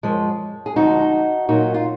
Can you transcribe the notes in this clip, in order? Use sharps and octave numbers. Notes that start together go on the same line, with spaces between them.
F#2 F3 G#3
G#4
D2 D3 F3 G#3 D#4 F#4
A#2 F#3 D#4 F#4
F4